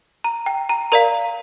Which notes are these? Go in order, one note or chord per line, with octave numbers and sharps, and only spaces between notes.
A#5
G5
A#5
A#4 D5 F5 A#5